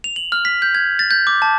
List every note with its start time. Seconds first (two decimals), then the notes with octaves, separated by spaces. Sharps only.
0.04 F7
0.16 F#7
0.32 F6
0.45 B6
0.62 G6
0.75 G#6
0.99 A6
1.11 G6
1.27 D6
1.42 A5